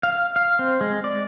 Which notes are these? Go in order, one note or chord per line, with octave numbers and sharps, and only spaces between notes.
F5
F5
C4
G#3
D5